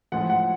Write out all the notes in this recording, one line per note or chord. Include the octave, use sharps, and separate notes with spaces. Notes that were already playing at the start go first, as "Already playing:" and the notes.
A2 F3 G#3 F#5
F#5